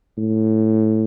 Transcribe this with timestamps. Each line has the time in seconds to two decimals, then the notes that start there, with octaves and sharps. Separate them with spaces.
0.18 A2